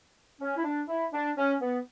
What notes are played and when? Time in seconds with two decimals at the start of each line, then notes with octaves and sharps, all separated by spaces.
0.40 C#4
0.56 E4
0.64 D4
0.88 E4
1.13 D4
1.36 C#4
1.60 B3